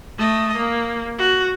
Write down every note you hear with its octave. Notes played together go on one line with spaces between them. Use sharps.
A3 D#5
A#3
F#4